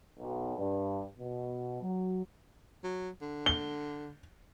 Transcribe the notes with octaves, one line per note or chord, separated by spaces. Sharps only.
B1
G2
B2
F#3
F#3
D3
G7